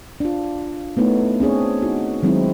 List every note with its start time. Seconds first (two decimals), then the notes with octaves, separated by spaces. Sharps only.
0.20 D4 F4
0.97 A3 B3 D#4 E4 C#5
1.40 C4 D4 G#4 C#5
1.82 D#4 E4 F#4
2.22 D#3 F#3 G#3 C4 D#4 E4